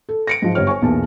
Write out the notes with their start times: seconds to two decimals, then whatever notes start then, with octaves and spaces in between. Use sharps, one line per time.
0.09 A4
0.27 A#6 C#7 D7
0.42 G#2 F3
0.55 G1 G3 C#5 F6
0.67 C#5 G#5 C#6
0.82 B1 E2 A#2 A5